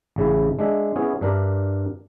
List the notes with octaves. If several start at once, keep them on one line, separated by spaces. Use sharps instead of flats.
A1 C#3 E4
G#3 D4 E5
B3 C#4 E4 G#4
G2 D4 A#4 E5